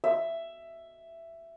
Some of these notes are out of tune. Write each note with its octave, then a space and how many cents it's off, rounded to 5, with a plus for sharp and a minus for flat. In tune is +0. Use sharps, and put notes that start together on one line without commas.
E5 +10